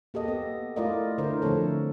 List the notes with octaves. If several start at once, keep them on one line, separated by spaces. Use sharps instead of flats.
A#3 G4 A4 D#5
B3
A3 E4 F4 A#4 D5 D#5
D3 E4 A#4 C5
D3 F3 A3 C4 A4 C#5